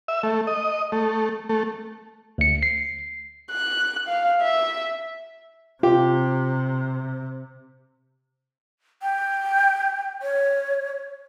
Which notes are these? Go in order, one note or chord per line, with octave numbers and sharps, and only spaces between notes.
E5
A3
D#5
A3
A3
D2 C#7
C7
F#6
F5
E5
C3 F4 G4
G5
C#5